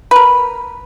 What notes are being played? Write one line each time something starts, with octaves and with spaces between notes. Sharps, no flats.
A#4 B4